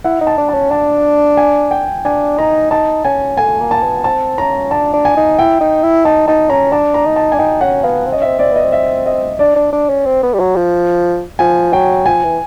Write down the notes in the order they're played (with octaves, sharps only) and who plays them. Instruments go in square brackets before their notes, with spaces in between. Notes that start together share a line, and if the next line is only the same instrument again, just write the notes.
[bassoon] E4 [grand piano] F#5
[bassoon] D#4
[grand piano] A5
[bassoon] D4
[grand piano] A5
[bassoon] C#4
[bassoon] D4 [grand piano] A5
[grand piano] G#5
G5
[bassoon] D4 [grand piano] G#5
[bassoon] D#4 [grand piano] A#5
[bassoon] D#4 [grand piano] A5
[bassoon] C#4 [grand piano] G#5
[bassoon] A3 [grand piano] G#5
[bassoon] A#3
[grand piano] A5
[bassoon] B3
[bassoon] C4 [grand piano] A5
[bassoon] C#4 [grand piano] A#5
[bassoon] D4 [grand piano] A5
[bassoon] D4
[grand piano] G#5
[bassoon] D#4
[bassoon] E4 [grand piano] G5
[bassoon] D#4
E4
[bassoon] D#4 [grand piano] A5
[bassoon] D#4 [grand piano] A5
[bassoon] C#4 [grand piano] A#5
[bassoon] D4 [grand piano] A5
[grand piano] A#5
[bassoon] D#4
[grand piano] A5
[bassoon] D4 [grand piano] G#5
[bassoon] D#4 [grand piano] G5
[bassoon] C#4 [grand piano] F#5
[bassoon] B3 [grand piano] F5
[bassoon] C4
[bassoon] C#4 [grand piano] D#5
[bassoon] C4 [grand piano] E5
[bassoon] C4 [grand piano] D5
[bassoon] B3 [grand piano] D#5
[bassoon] C4
[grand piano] E5
D#5
[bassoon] D4 [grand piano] D5
[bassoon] D4
D4
C#4
C4
B3
G3
F#3
F3
[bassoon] F3 [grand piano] G#5
[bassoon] F#3 [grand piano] G5
[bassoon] F3 [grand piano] G#5
[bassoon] E3